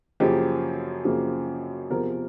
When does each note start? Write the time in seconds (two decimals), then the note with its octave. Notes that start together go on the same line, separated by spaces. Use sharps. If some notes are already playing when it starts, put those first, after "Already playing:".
0.20 F#2 C#3 F3 A#3 G4
1.05 F#2 C#3 F3 A#3
1.90 E2 C3 F3 A#4